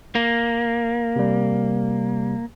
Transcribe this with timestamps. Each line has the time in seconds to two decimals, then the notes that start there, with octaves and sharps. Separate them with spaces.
0.15 A#3
1.16 C3 G3